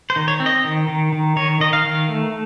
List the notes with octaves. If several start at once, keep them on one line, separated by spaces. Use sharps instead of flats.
C5
D#3
C#5
C4
D#5
D#3
D#3
D#3
D#3 C#5
D#3 D#5
F5
D#3
A3